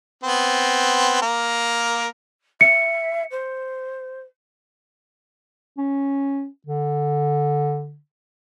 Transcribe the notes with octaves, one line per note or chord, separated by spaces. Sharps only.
B3 C4
A#3 A#4
E5 C#7
C5
C#4
D3